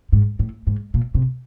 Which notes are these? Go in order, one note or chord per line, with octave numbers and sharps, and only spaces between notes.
G#2
A2
G#2
A#2
C3